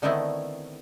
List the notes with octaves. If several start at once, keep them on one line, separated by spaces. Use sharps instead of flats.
D3 D#3 A3 B3 C4 E4